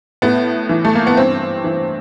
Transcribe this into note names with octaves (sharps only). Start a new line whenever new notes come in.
A2 B3
E3
A3
A#3
B3
G2 C4
E3